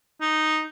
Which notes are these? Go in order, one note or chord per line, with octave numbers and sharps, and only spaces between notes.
D#4